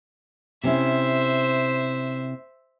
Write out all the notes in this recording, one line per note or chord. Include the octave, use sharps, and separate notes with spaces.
C3 C#4 E4 C5 E5